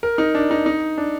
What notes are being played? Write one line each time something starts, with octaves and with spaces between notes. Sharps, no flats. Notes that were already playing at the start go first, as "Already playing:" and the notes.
A#4
D#4
D4
D#4
D#4
D4